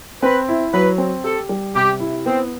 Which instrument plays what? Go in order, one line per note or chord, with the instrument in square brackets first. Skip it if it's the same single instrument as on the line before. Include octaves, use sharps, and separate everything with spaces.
[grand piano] C4 [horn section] B4
[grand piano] E4
[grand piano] F#3 [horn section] B4
[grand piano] C4
[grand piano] G4 [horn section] A4
[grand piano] G3
[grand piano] C3 [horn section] G4
[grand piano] E4
[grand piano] B3 [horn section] C4